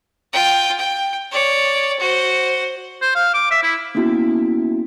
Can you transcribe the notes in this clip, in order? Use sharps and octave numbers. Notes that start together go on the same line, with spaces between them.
F4 G5
G5
C#5 D5
F#4 C5
C5
F5
D6
E5
E4
A#3 B3 C#4 E4 F#4